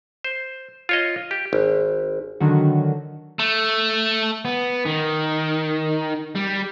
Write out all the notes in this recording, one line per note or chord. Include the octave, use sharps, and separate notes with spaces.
C5
F4 C#5 D#5
G4
G#1
D3 D#3 F#3 F#4
A3
B3
D#3
G3